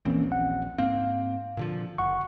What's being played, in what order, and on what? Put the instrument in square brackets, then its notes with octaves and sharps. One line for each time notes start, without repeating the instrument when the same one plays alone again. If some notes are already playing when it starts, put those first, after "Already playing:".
[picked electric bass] D#1 A#1 C4 [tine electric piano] E3 A#3 C#4
[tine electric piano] F#5
[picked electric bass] G#2 A#3 C4 [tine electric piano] F5
[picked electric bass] A#2 D3 F3
[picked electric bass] F#1 [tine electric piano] F#5 C#6